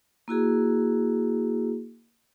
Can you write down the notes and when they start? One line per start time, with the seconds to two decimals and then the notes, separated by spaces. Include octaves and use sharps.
0.28 A#3 E4 F#4 G#4